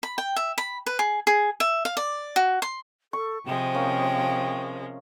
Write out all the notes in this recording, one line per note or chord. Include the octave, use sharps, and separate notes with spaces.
B5
G5
E5
B5
B4
G#4
G#4
E5
F5
D5
F#4
C6
A4 C#6
C3 F3 G#3 G5
A#3 C#4